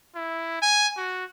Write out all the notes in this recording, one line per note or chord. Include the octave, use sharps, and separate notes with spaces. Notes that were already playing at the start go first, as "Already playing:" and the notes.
E4
G#5
F#4